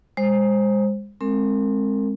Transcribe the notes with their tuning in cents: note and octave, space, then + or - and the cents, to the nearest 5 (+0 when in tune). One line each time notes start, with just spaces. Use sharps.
G#3 -30 C5 +15
G#3 +0 C4 +25 A#4 -35